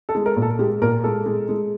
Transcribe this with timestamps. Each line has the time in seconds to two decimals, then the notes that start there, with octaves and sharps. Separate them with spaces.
0.09 A4
0.15 G#3
0.26 A#4
0.36 A#2
0.42 A4
0.59 G#3 G4
0.82 A#2 A#4
1.04 G#3 A4
1.26 G#3
1.49 G#3